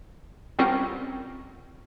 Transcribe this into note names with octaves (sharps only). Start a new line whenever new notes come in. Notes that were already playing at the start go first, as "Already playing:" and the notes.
G3 C4 C#4 F4 A#4 F#5